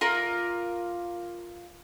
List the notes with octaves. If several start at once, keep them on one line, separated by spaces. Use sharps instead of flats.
F4 A#4 D5